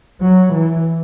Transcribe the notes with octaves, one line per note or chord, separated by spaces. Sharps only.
F#3
E3